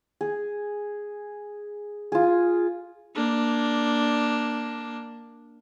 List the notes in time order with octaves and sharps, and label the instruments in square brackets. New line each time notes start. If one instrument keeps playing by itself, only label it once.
[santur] G#4
F4 G#4
[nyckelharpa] A#3 D4